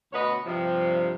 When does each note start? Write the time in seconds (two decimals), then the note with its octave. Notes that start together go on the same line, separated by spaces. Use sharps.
0.13 D2 B2 B3 B4 C#5 D#5
0.46 G2 C3 F3